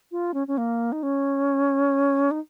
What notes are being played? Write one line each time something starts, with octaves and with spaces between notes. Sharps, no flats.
F4
C#4
C#4
A#3
D#4
C#4
D#4